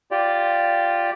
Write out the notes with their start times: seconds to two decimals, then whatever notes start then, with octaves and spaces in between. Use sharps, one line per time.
0.11 F4 G4 D5